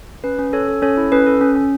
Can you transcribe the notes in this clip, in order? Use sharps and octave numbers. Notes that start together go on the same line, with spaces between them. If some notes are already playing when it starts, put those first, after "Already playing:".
C#4 B4
C#4
C#4 A4 C#5
A4
C#4 A4 C#5
E4
C#4 B4
A4
C#4
C#4